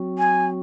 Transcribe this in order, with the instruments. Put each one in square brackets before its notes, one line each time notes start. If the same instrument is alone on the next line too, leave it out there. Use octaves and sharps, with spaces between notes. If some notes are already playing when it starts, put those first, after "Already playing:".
Already playing: [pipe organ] F#3 C4 F#4
[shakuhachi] G#5